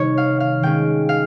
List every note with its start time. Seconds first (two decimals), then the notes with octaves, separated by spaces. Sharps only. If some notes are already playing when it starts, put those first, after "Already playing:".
Already playing: C3 D#3 G3 C#5
0.18 F5
0.40 F5
0.63 D#3 G#3 C#4 G5
1.09 F5